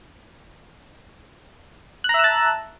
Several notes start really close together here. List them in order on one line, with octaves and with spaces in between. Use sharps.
F#6 A#5 E5 E6 A5